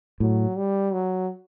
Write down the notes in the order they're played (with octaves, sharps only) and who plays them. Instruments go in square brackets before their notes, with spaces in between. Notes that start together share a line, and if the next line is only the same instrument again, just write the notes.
[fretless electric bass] A2 [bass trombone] F#3
[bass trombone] G3
F#3